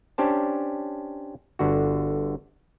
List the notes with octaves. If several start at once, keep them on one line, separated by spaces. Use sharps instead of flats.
C#4 D4 G4 C5 A5
G1 D3 F#4